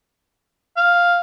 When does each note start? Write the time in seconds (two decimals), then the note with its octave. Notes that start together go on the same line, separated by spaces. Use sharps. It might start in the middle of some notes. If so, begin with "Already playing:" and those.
0.77 F5